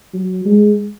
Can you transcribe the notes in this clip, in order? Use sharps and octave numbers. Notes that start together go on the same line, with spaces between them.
F#3
G#3